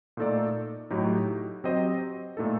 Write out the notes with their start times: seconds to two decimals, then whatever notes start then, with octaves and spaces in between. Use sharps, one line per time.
0.17 A#2 A3 D#4 A4 D5
0.91 A2 F#3 A3 D#4 G4
1.64 F#3 C4 G4 C5 D#5
2.37 A#2 A3 D#4 A4